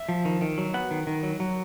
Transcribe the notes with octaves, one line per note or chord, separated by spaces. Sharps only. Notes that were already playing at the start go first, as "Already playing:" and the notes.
Already playing: E5
F3
D#3
D#3
F#3
B3 F#5
D#3
D#3
F#3
F#3